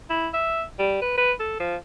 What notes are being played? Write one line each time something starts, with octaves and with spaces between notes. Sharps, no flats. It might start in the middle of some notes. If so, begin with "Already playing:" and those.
E4
E5
G3
B4
B4
A4
F3